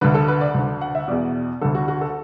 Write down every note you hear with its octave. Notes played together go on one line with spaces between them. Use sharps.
D2 D3 B4
A4
B4
D5
D2 D3
F#5
E5
E2 B2 D5
D2 D3 A4
F#4
F#4
A4